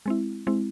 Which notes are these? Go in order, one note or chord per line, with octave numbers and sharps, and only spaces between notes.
G#3 C4 E4
G#3 C4 E4